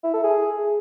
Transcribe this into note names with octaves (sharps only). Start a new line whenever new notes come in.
E4
A4
G#4